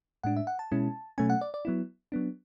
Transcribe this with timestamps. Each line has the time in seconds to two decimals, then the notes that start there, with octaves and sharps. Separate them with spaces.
0.24 A2 G#3 D4 F#5
0.36 E5
0.47 F#5
0.59 A5
0.72 B2 G#3 C#4 E4
1.18 B2 F#3 A3 C#4 G#5
1.30 F#5
1.41 D5
1.54 D5
1.65 F#3 B3 E4
2.12 F#3 B3 D4